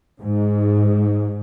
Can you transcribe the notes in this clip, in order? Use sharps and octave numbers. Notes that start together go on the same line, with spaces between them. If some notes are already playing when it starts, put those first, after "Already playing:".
G#2